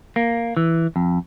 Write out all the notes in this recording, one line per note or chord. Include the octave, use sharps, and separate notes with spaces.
A#3
E3
F2